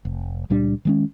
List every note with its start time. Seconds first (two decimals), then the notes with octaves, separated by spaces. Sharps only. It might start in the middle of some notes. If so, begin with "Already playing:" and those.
0.05 F1
0.50 C#2 A#2 G3 D4
0.85 D#3 G#3 C#4